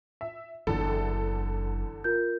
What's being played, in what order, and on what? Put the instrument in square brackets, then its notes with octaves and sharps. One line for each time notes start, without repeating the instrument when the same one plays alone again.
[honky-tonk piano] E5
[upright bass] F#1 [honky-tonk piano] E2 D3 A4 [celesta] B5
[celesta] F4 A#4 G6